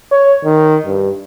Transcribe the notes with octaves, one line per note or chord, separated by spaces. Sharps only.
C#5
D#3
G2